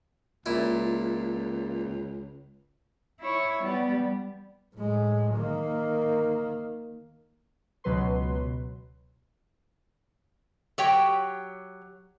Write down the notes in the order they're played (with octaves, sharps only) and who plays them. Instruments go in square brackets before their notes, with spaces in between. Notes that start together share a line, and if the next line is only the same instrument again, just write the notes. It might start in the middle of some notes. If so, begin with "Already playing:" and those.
[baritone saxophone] C#2 [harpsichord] A#2 E4 F4
[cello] E4 C#5
G3 B3
[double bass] A2 G#3
D#3 A#3
[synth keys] C#2 B2 F#3 B4 C6
[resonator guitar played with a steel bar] F#3 G4 C#5 G5